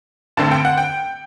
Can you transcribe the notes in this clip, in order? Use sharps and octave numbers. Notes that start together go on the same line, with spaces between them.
A1 G2 D3 A3 C4 A5
G5
F#5
G5